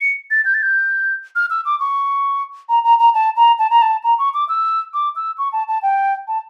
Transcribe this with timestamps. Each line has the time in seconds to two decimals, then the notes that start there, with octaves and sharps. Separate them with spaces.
0.01 C#7
0.31 A6
0.45 G6
0.54 A6
0.62 G6
1.36 F6
1.50 E6
1.65 D6
1.80 C#6
2.69 A#5
2.84 A#5
2.99 A#5
3.14 A5
3.36 A#5
3.59 A5
3.70 A#5
3.82 A5
4.04 A#5
4.19 C#6
4.34 D6
4.49 E6
4.94 D6
5.16 E6
5.38 C#6
5.53 A5
5.68 A5
5.82 G5
6.28 A5